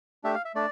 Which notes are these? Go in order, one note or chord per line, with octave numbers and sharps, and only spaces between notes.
A3 D4 G4 E5
F5
E5
A3 D4 D5